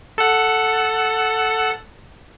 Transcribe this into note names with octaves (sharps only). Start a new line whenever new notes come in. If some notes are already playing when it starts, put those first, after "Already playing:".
A4 F#5